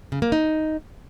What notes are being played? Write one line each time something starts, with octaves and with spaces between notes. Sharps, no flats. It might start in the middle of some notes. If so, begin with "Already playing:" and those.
C#3
A#3
D#4